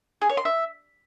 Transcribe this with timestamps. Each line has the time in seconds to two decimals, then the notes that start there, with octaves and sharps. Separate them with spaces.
0.22 G#4
0.29 C#5
0.37 C6
0.45 E5